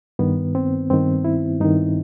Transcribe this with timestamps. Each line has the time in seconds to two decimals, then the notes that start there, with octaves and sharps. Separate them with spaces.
0.19 G2 D#3 B3
0.55 C4
0.90 G2 D#3 C4
1.25 E4
1.60 G2 D#3 D#4